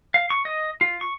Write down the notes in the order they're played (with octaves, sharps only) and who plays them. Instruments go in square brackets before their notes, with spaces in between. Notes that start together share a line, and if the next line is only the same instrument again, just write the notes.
[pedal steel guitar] F5
C#6
D#5
F4
C#6